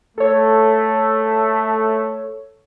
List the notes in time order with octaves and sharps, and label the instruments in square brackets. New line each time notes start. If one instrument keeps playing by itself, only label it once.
[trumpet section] A3 [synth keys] A4 C#5